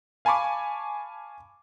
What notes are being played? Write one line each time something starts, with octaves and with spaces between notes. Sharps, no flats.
F5 G#5 A5 B5 C#6 D6